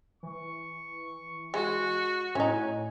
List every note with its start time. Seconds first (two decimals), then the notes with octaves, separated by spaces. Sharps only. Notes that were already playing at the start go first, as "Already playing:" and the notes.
0.23 E3 C#6
1.54 G#3 F#4
2.35 A2 C#4 D#4 G#5